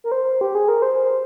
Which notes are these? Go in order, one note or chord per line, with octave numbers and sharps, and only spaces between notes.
A#4
C5
G4
G#4
A#4
C5